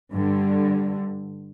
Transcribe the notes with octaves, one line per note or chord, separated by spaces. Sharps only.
G2 D3